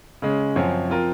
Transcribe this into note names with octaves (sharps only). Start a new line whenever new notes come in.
C#3 G#3 C#4
F#2 F3 C4 F#4 C#5
F3 C4 F4 A#4